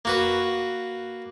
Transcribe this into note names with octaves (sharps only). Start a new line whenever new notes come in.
A#3 F#4 B4